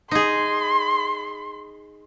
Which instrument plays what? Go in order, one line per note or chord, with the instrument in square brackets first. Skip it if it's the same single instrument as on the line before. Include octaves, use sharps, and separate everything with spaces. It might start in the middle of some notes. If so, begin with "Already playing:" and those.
[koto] D#4 G#4 [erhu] C6